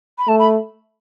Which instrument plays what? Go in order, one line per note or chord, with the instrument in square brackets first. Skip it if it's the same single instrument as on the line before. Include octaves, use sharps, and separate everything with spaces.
[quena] B5
[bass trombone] A3 [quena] A5
[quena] B5